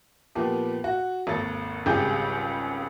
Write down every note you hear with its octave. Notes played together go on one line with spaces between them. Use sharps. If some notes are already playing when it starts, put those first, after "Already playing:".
A#2 F3 B3 G4
F#4
G#1 D#2 A4 A6
G#1 C#2 G3 G#4 G5 G6